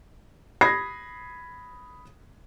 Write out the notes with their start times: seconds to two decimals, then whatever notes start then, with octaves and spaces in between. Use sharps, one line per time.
0.61 B5 D#6 G#6 A#6 C7